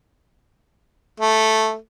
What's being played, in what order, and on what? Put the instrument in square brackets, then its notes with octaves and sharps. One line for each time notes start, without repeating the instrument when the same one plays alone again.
[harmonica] A3